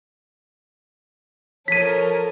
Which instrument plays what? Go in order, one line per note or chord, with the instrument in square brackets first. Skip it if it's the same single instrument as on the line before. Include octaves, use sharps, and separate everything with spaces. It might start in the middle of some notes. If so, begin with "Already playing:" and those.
[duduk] F3 [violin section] A4 A#4 [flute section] C#5 [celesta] B6 D#7